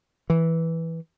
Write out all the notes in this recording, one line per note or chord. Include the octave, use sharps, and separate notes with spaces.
E3